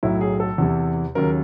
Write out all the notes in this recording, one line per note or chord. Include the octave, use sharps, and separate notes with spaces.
B1 A2 F#3 E4
G#4
A4
E2 C3 E3
D#2 C#3 F#3 A#4